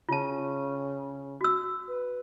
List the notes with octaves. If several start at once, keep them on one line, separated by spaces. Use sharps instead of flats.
C#3 F4 A5
F#4 E6
B4